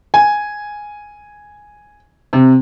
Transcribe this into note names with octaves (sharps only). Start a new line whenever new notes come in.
G#5
C3